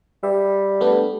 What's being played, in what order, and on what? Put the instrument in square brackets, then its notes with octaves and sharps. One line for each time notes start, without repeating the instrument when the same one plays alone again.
[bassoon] G3 [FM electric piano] E5
[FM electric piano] A3 B3 D4